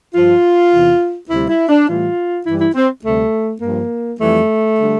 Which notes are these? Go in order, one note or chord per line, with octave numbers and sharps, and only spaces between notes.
G2 F3 F4
E2 C3 E3
D2 C3 G3 E4
E4
D4
A2 E3 G3 F4
G2 E3 G3 E4
E4
C4
D2 C3 G3 A3
G2 F3 A#3
F2 E3 G3 A3
D3 G3